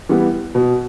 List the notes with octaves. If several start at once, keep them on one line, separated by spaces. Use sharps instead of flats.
E3 G3 B3
B2